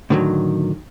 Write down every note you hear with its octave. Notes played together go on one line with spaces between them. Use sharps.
A2 D3 D#3 F3 F#3